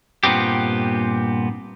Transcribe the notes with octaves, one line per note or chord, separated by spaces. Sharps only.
G2 A#2 B3 C4 G4